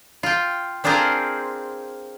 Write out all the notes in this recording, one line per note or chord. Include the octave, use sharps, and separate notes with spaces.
F4 G5
C4 D4 F4 G#4 A#4 C5